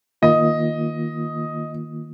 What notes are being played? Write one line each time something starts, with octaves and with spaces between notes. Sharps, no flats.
D#3 A#3 F4 D#5